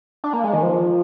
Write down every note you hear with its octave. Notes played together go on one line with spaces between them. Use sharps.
D4
A#3
G#3
D#3
F3